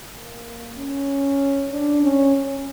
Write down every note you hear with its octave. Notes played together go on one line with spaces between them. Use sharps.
A#3
C#4
D4
C#4